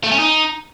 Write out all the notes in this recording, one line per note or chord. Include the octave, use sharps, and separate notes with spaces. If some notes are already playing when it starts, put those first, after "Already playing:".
A3
C#4
D#4